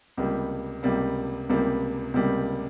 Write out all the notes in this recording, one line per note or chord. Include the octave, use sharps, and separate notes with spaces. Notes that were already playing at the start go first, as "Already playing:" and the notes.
C#2 C3 G3 A#3
C#2 C3 G3 A#3
C#2 C3 G3 A#3
C#2 C3 G3 A#3